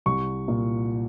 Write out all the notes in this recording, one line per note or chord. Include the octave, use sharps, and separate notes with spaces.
C2 C#6
A#2